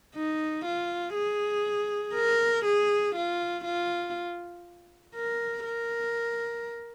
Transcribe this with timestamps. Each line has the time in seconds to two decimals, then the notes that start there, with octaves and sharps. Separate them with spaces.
0.15 D#4
0.65 F4
1.15 G#4
2.15 A#4
2.65 G#4
3.16 F4
3.65 F4
5.15 A#4
5.65 A#4